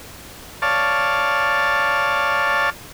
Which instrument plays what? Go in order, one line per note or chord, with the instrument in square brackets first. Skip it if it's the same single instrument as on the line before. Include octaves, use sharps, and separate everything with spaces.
[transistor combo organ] C#5 D5 F5 A5